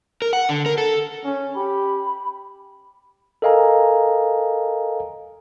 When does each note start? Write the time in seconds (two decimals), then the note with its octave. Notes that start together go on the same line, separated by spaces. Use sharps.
0.22 A#4
0.33 F#5
0.49 D3
0.66 A#4
0.78 A4
1.24 C#4
1.56 G4 B5
3.42 A4 A#4 D#5 F5 G#5 A#5